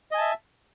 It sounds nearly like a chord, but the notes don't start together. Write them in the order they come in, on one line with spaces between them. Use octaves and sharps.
D#5 G#5 A5 E5